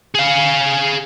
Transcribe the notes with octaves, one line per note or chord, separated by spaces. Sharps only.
G#4 F5